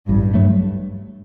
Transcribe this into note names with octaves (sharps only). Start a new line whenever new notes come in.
A1 G2
G2 F#3 A3